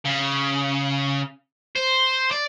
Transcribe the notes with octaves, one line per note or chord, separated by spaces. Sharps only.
C#3
C5
D5